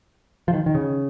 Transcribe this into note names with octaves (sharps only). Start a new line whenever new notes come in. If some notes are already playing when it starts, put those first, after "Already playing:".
F3
D#3
D#3
C#3